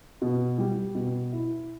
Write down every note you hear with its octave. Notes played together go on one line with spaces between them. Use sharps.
B2
G3
B2
E4